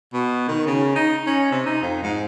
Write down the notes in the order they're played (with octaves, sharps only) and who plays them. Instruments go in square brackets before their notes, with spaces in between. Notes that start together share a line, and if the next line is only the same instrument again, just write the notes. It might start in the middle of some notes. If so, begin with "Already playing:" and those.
[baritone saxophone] B2
D#3
C#3
D#4
C#4
C3
D#4
F2
G#2